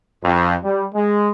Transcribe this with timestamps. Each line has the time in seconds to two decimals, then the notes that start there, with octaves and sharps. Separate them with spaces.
0.23 F2
0.64 G3
0.94 G#3